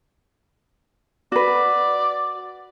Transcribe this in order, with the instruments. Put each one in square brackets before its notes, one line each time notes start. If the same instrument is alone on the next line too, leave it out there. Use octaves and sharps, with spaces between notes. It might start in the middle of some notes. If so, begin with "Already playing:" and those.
[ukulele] F#4 B4 [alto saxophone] D5